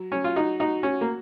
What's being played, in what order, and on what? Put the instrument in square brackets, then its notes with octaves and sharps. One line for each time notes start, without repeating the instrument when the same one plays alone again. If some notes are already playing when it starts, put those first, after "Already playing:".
Already playing: [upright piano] F#3
[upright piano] F#3 [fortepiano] C#4
[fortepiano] F4
[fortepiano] D#4 [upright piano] F#4
[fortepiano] D#4 [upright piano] F#4
[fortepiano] C#4 [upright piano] F#4
[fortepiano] A#3